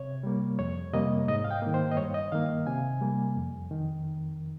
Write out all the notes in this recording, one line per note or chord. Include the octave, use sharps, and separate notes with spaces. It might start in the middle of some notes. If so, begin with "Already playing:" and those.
Already playing: C3 C#5
G3 A#3
F2 C#5
C3 G3 A#3 D#5
G#2 D#5
F5
G5
D#3 A#3
C5
D#5
G2 C#5
D#5
D#3 A#3 F5
C3 G#5
G3 A#3
F2
D#3